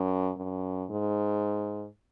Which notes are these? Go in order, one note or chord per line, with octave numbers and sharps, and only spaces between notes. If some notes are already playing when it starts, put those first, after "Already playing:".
Already playing: F#2
F#2
G#2